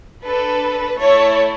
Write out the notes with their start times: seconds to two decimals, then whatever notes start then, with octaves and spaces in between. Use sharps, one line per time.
0.26 D4 A4 B4
0.99 A3 E4 A4 C#5